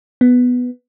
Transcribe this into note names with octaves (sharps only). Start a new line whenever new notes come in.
B3